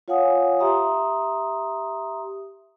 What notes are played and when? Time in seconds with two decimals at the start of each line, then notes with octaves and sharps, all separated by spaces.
0.08 F4 C#5 F5 F#5 G#5 D#6
0.60 G4 E5 A#5 C6 D#6